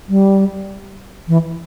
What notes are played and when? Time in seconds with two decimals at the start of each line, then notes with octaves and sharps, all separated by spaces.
0.09 G3
1.28 E3